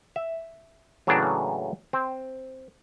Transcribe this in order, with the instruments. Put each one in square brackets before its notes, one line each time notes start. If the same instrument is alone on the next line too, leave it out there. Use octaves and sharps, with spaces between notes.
[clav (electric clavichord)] E5
A2 C#3 E3 F#3 A#3 D4
C4